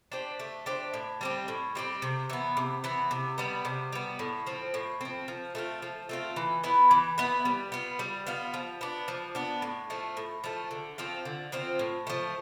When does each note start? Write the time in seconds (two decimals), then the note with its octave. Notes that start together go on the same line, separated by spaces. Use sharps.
0.12 D4 G4 C5
0.40 A3
0.66 D4 G4 C5
0.94 A2
1.21 G3 C4 G4
1.48 A2
1.75 G3 C4 G4
2.02 C3
2.30 E3 B3
2.57 C3
2.84 E3 B3
3.11 C3
3.38 G3 B3
3.65 C3
3.93 G3 B3
4.19 A2
4.47 F3 C4
4.74 A2
5.01 F3 C4
5.28 F3
5.55 A3 C4 F4
5.82 F3
6.09 A3 C4 F4
6.36 E3
6.63 B3 E4 B4
6.91 E3
7.18 B3 E4 B4
7.45 G3
7.72 B3 F4
7.99 G3
8.27 B3 F4
8.54 F3
8.81 B3 D4
9.08 F3
9.35 B3 D4
9.62 A2
9.90 F3 A3
10.17 A2
10.44 F3 A3
10.71 D3
10.98 F3 C4 F4
11.25 D3
11.52 F3 C4 F4
11.79 A2
12.07 F3 A3